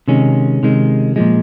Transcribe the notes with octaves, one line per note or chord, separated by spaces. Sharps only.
C3 D#3 G#3 C#4
C3 D#3 G#3
A#2 F3 G#3